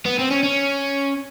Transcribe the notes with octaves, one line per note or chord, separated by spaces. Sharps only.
B3
C4
C#4
C#4